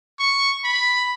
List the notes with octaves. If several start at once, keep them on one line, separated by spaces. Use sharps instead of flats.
C#6
B5